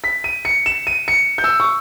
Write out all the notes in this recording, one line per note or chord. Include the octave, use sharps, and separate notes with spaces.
B6
D#7
C#7
E7
D#7
C#7
G6
E6
C#6